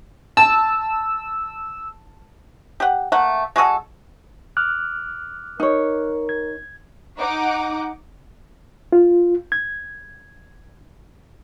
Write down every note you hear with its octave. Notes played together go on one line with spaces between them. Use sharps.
A5 E6
G4 F#5
A3 A#3 F#5
G#3 F#4 G#4 A4
D6 F6 F#6
D#4 A#4 C#5
G#6
D#4 F#5 D6
F4
G#6